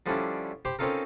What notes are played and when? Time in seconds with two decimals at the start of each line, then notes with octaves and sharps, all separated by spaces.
0.06 D3 F3 G3 C#4 D4 E4
0.65 G4 C5 B5
0.79 C4 C#4 D#4 F4 A4 A#4